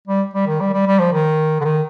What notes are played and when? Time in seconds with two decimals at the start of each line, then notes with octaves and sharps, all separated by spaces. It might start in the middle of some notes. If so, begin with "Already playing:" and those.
0.08 G3
0.34 G3
0.47 D#3
0.60 G3
0.73 G3
0.87 G3
0.99 F3
1.12 D#3
1.60 D3
1.64 D#3